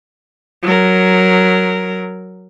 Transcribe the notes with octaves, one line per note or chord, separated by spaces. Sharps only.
F#3 A#4